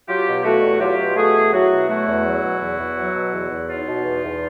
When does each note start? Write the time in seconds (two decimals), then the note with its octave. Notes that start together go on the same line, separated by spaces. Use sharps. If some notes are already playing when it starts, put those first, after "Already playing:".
0.08 F#3 F4 G4
0.26 B2
0.44 A3 E4 F#4
0.62 E2
0.80 F#3 F4 G4
0.99 B2
1.16 A3 F#4 G#4
1.35 E2
1.53 F#3 E4 F#4
1.70 B2
1.88 A3 E4 F#4
2.07 E2
2.25 F#3
2.43 B2
2.61 E2
2.79 E2
2.97 F#3
3.15 B2
3.33 E2
3.51 E2
3.69 F#3 D#4 F4
3.87 B2
4.05 E2
4.24 E2